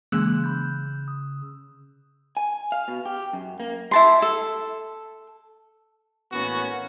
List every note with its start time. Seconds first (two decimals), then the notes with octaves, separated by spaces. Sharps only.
0.12 C#3 E3 G#3 A#3 E6 F#6
0.44 B5 G6
1.08 D#6
2.37 G#5
2.72 F5
2.88 B2
3.06 G4
3.33 F#2
3.60 A#3
3.91 E4 A5 C6
4.22 A4
6.32 A2 E3 A#3 B3 C#4 F#4